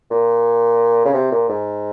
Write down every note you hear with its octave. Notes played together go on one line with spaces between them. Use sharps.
A#2
C#3
C3
A#2
G#2